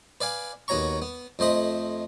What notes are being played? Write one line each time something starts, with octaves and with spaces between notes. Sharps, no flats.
B4 D5 F5 G#5
D#2 B3 F#4 C#5 A#5 C#6
B3
F2 A3 C5 D#5 B5